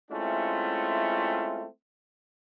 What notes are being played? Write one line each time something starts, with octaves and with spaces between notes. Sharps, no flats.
G#3 A3 C4 C#4 E4 F4